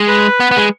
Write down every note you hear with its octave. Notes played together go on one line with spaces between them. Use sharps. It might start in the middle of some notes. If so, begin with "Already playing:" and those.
Already playing: G#3
B4
B3
B3
G#3